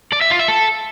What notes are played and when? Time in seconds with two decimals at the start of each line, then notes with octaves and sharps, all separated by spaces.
0.13 D5
0.21 E5
0.30 F4
0.39 E5
0.48 A4